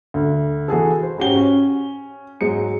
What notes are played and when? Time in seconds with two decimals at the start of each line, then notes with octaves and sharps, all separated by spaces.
0.14 D2
0.68 E3 F#4 G#4 A4
1.02 C5
1.18 G#2 C#4 F#4 G4 G7
1.37 C#4
2.41 G#2 F#3 G#3 C#7